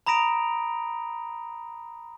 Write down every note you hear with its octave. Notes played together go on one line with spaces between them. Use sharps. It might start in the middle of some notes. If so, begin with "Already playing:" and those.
A#5 B5 D#6 A#6 D7 F7